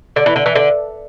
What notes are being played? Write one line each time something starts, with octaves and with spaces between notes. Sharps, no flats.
D3
E3
D3
E3
D3